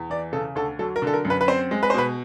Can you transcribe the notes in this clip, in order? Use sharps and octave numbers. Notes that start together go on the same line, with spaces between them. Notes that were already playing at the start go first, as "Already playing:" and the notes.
Already playing: E2
E3 D5
C#3 A4
D2 A4
F#3 A4
A#4
D3
A4
A#4
F#2
B4
B4
C4 C5
G#3
B4
C5
B2 B4